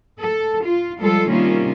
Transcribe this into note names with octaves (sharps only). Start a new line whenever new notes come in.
A4
F4
F3 G3 G#3 F4 A4
C3 D#3 G3 A#3 C#4 F4